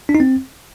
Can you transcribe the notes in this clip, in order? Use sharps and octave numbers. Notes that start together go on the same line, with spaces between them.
D4
D#4
C4